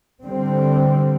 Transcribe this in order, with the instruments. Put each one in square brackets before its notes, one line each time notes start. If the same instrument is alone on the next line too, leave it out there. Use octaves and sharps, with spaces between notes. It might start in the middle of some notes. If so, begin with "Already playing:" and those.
[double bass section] D3 G3 C4